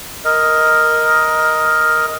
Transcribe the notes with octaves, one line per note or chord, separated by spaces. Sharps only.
A#4 D#5